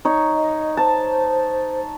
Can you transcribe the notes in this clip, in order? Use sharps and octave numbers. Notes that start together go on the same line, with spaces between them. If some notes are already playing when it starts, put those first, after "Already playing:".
D#4 C#5
D#5
C5 A5